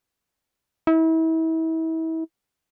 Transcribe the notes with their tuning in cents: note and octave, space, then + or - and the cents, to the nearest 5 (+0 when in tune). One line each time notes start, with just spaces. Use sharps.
E4 -35